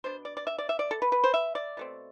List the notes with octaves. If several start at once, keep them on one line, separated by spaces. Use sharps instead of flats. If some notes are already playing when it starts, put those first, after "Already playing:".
B2 B3 D4 C5
D5
D5
E5
D5
E5
D5
A4
B4
B4
C5
E5
D5
B2 A3 C4